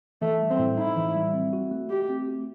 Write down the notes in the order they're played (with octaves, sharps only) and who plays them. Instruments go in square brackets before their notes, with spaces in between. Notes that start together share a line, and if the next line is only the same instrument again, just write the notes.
[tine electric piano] E3 [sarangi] A3
[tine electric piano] G3
[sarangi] C4
[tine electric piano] A2
[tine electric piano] D#4 [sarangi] E4
[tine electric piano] E3
G3
C4
F#4
A3
[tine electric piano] A3 [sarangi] G4
[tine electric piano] C4
F#4